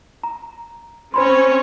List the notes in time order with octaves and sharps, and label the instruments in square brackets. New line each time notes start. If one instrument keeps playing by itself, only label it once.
[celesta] A#5
[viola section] C4 C#4 C#5 [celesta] C5 B5 C6